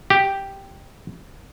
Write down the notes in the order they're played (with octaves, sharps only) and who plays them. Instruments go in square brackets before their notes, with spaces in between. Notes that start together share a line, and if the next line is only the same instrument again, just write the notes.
[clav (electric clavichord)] G4